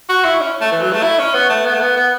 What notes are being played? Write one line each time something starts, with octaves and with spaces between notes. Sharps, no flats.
F#4
E4
C#4
A3
E3
F#3
A3
E4
C#4
B3
A3
B3
A3
B3
B3